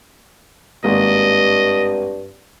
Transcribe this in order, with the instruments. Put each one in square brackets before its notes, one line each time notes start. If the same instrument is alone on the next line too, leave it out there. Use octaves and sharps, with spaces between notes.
[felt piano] G#1 G#3 A#3 [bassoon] G2 [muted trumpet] D#5